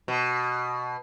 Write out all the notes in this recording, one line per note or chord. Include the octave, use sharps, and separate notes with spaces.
B2